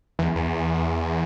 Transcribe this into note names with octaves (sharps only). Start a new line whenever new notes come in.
E2
E2